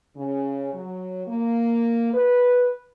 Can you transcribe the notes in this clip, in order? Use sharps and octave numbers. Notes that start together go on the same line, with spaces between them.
C#3
F#3
A#3
B4